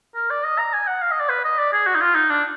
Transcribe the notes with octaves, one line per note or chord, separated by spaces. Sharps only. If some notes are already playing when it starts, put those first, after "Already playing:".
A#4
D5
D#5
A#5
G#5
F#5
F5
D#5
D5
B4
D#5
D5
G#4
F#4
D#4
F4
D#4
D4